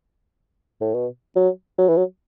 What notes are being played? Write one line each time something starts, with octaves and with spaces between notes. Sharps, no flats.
A2
B2
F#3
F#3
E3
F#3